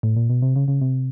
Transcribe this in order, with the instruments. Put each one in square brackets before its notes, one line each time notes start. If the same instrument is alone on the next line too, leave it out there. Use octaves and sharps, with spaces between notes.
[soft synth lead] A2
A#2
B2
C3
C#3
C#3
C3